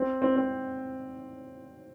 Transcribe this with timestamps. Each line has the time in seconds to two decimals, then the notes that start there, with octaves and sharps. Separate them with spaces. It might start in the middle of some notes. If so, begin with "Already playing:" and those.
Already playing: C4
0.22 C4
0.36 C4